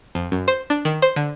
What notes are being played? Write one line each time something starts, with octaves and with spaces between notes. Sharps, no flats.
F2
F#2
C5
D4
D#3
C5
D3